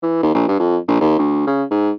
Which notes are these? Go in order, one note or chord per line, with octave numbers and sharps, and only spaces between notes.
E3
D#2
A#1
G2
F2
A#1
D#2
D2
C#3
G#2